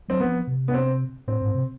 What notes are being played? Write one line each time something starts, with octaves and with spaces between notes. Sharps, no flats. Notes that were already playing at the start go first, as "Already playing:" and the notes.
F#3 C4
F3 B3
C3
B3
C4
A2 C4
G#2
C3